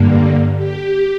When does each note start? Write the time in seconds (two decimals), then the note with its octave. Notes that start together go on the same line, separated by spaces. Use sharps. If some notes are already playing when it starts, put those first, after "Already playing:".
Already playing: G2 D3 A#3
0.57 G4